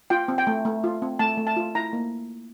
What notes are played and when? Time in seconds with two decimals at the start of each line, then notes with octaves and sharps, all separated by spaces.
0.10 F4 G5
0.28 C4
0.38 G5
0.47 A3
0.65 A3
0.84 F4
1.02 C4
1.19 A3 A5
1.38 A3
1.47 A5
1.57 F4
1.75 E4 A#5
1.93 A#3